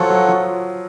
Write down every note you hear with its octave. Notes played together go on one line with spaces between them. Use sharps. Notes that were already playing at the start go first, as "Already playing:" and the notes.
Already playing: F3 F#3 F4 A4 C#5 F#5
F#3
F3